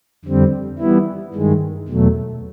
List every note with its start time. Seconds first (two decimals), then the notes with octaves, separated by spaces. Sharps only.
0.25 F2 D3 G3 C4
0.79 E3 G3 B3 E4
1.34 G2 D#3 G#3
1.89 E2 B2 F#3 A3